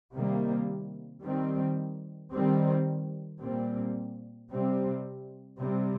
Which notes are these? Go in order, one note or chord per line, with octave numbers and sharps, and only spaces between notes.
C3 D#3 G3 A#3
D#3 G3 C4
D#3 G3 C4
A#2 G3 C4
C3 G3 C4
C3 G3 C4